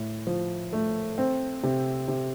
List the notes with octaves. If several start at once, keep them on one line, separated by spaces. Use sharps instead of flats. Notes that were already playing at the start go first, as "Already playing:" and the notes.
Already playing: A2
F3
A3
C4
C3
C3